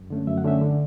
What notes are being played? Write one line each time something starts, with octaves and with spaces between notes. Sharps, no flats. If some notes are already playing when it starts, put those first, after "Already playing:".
Already playing: F#2
D3 A3 C#4
F#2 E5
F#5
D3 A3 C#4 E5
D3